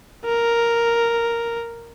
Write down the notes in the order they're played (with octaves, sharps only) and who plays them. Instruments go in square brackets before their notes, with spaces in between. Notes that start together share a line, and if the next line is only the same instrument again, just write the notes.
[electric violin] A#4